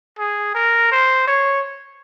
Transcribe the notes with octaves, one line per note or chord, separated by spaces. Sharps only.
G#4
A#4
C5
C#5